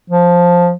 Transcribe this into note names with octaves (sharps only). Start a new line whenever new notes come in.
F3